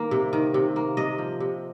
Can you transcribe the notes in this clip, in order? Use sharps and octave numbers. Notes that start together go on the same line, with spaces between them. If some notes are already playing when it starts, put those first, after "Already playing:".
Already playing: D#3 A#3
C3
D#3
C3
A#3
C3 D#5
F3
C3